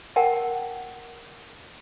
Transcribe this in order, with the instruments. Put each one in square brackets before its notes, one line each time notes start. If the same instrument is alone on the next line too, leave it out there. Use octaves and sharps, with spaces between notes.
[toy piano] A#4 F#5 G5 A5